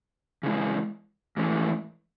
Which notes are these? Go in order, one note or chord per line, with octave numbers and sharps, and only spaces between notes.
C#3 E3 G#3
G#2 E3 A3